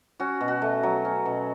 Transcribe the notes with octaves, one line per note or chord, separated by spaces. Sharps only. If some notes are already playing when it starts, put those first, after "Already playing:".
C#4 F#4
B2
F#4
A3
F#3
C#4
B2